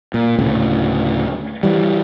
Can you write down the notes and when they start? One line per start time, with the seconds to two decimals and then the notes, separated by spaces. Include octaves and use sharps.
0.14 A#2
0.39 D2 A2 C#3
1.63 E3 G3